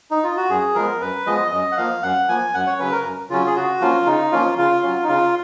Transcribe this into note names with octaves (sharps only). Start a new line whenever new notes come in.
D#4
F4
F#4
F#2 G#4
F3 G#3 B3 A#4
F#2 B4
F3 G#3 B3 D#5
F#2 D#5
F#5
F3 A#3 F5
F#2 F#5
F3 A#3 G#5
F#2 F#5
C#5
C#3 F#3 C#4 B4
A#4
F#2
C#3 F#3 C#4 F4
G#4
C#3 F#4
F3 A#3 C#4 F4
C#3 D#4
F3 A#3 C#4 F4
C#3 F4
F#3 C#4
D#4
C#3 F4